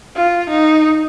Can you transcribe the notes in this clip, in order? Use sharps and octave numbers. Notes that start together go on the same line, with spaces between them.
F4
D#4